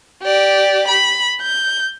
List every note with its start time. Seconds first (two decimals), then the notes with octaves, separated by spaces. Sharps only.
0.23 G4 D5
0.88 B5
1.42 G6